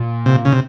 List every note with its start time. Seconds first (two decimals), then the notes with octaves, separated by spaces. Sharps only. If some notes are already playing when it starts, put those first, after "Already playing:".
Already playing: A#2
0.26 C3
0.45 C#3
0.52 C3